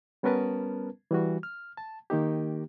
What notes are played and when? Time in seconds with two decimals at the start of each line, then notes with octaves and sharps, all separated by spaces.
0.23 G3 B3 C#4 A#4 B4 A5
1.11 E3 G3 F#4
1.43 F6
1.77 A5
2.10 D#3 A#3 D#4 G4